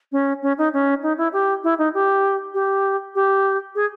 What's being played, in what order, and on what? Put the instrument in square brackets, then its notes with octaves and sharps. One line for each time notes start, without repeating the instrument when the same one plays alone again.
[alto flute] C#4
C#4
D#4
C#4
D#4
E4
G4
E4
D#4
G4
G4
G4
G#4